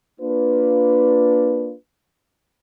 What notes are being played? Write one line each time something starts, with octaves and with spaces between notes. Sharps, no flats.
A#3 D4 F4 B4